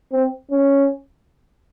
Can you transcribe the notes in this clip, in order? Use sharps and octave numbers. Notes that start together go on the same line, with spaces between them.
C4
C#4